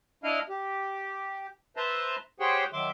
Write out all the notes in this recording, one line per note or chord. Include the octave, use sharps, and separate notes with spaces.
D4 E4 D#5 F5 F6
G4
B4 C5 E5 A5 A#5 C6
G4 G#4 C5 C#5 F#5 G5
D#3 F#3 E5 C6 D6